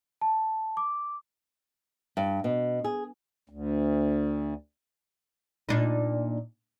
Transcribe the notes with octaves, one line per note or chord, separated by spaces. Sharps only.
A5
D6
G2
B2
G#4
D2
A#2 D4 D#4